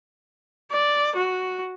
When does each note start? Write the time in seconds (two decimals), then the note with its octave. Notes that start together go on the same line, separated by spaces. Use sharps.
0.72 D5
1.16 F#4